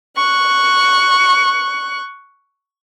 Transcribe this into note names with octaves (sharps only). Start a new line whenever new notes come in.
C#6 F#6